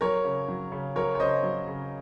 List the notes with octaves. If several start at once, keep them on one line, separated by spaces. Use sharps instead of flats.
F#3 A#4 C#5
C#3
F#3
C#3
F#3 A#4 C#5
C#5
C#3 C5 D#5
F#3
C#3